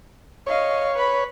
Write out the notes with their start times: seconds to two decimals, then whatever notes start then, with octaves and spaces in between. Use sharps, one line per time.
0.47 C#5 D#5 F5
0.96 B4 B5